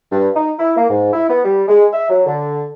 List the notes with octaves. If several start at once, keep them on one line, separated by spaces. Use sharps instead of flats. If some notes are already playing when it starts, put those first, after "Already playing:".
G2
D#4
E4
A#3
G#2
E4
B3
G3
G#3
E5
F#3
D3